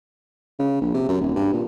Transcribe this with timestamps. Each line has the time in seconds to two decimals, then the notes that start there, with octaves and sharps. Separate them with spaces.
0.59 C#3
0.81 A#1
0.94 C3
1.08 F#2
1.21 D#1
1.36 G2
1.53 A#2